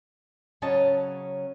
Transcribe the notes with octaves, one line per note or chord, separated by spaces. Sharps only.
C#3 F#3 C#4 D#5 A5